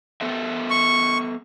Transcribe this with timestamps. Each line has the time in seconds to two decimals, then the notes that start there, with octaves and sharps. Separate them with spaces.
0.21 B3 A4 E5
0.70 C#6